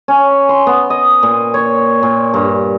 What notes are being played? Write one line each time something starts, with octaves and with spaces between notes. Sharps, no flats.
C#4
C6
B3
D#5
A#2
C#5
A#2
G2